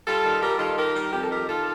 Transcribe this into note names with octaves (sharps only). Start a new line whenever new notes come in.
G3 F4 A4
D#3
G3 G4 A#4
D#3 F4 A4
D#3 G4 A#4
G3
F2 G4
A4
D#3 G4 A#4
D#3 F4 A4